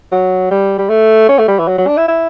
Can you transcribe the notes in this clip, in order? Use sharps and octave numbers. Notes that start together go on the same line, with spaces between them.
F#3
G3
G3
A3
C#4
A3
G3
E3
F#3
F#3
D4
E4
E4